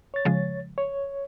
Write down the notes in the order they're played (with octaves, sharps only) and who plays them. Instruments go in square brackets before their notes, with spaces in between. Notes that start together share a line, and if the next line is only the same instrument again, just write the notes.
[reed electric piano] C#5 A6
[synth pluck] C#3 F3 G#3
[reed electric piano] C#5